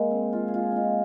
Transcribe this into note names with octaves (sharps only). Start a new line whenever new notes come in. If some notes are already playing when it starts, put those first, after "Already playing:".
Already playing: G#3 A#3
C4
F4
G#4
F4
D#4 F4